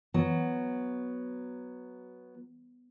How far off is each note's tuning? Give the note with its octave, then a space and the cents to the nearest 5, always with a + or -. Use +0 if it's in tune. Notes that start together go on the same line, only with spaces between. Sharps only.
F#3 +0 B3 +0